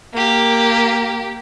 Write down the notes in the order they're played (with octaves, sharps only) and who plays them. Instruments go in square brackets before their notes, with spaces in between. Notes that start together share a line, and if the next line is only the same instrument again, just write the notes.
[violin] A#3 G4